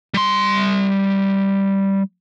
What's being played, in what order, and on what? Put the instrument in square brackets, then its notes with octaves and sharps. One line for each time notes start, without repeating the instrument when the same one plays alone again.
[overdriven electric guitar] G3 C6